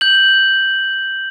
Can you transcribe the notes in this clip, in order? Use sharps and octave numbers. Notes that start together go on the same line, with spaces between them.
G6 F#7